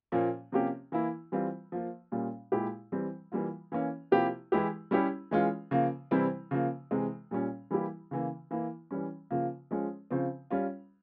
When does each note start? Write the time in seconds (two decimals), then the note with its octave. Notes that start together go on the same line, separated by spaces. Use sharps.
0.12 A#2 F3 A#3 C#4
0.52 C3 F3 A#3 C#4 G4
0.92 E3 A#3 E4
1.32 E3 G3 C4 F4
1.72 F3 A#3 F4
2.12 A#2 G3 A#3 C#4 F4
2.52 A#2 G#3 E4 G4
2.92 E3 G3 C4
3.32 E3 G3 A#3 F4
3.72 E3 A#3 C#4
4.11 C3 F3 A#3 E4 G4
4.52 E3 G#3 E4 G4
4.91 G3 C#4 E4 G4
5.31 E3 G#3 C#4 F4
5.71 C#3 F3 A#3
6.11 C3 E3 G3 C4 E4
6.51 C#3 F3 A#3
6.91 C3 E3 G#3
7.31 A#2 G3 C#4
7.71 E3 G3 A#3 E4 G4
8.11 C#3 E3 A#3
8.51 E3 A#3 E4
8.91 E3 G3 C#4
9.31 C#3 F3 A#3 F4
9.71 F3 G#3 C#4
10.11 C#3 F3 C4
10.50 G3 C#4 F4